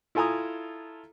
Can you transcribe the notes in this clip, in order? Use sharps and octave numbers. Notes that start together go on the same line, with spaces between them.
E4 F4 A4 G#5 A#5 D#6